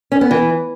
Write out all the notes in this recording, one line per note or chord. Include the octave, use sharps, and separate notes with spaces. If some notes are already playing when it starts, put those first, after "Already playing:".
C#4
B3
E3